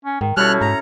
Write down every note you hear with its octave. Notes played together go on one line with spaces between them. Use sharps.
C#4
G#2 D#3
B2 G3 C#4 E4 A4 F6 F#6
C#4
G#2 A#5 B5